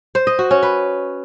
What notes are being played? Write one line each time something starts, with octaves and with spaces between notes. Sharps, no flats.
C5
D#5
F#4
C#4
B4